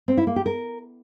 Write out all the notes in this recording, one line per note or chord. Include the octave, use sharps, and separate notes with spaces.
C4
E4
A#3
G4
A#4